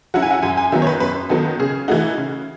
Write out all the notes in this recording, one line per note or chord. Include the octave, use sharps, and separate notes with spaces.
F#3 C#4 E4 F#5
G#5
F#5
F#2 G#5
G#5
D#3 F#3 B3 E5
C#5
B4
F#2 B4
D#3 F#3 B3 A4
C#3 G#4
E3 A3 D#4 F#4
C#3